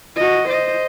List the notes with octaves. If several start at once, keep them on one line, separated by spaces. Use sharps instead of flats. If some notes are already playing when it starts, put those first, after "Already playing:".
F#4 D#5
C5 D#5